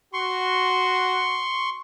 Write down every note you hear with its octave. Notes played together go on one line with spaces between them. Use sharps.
F#4 C6 C#6